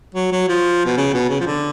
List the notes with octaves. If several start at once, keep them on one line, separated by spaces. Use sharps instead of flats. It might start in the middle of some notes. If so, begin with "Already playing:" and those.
F#3
F#3
F3
B2
C#3
B2
C#3
F3
D3